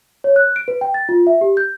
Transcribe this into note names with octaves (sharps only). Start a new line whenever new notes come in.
C#5
F#6
D7
B4
G5
A6
F4
E5
G4
G6